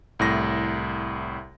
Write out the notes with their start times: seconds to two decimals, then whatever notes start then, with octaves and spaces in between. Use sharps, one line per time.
0.19 C2 A2 A#6